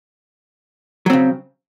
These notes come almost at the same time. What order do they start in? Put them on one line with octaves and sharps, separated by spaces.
F#3 C4 C#3